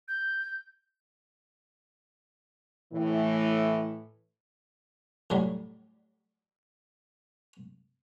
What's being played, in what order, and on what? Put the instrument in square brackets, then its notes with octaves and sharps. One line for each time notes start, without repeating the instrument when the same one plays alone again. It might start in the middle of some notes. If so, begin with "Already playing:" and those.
[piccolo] G6
[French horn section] A2 E3
[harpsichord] A2 F#3 G3